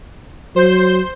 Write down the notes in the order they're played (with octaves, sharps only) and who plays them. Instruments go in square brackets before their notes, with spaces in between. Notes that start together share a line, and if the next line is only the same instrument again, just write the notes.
[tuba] F#3 [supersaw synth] C5 G6